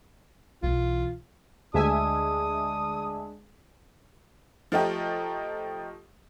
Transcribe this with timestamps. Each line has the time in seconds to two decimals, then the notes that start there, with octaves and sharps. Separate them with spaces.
0.63 B1 E3 F4
1.74 D2 G#3 D4 E5 G#5 D#6
4.72 F3 A3 D#4 G4